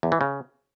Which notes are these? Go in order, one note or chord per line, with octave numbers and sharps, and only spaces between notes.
E2
E3
C#3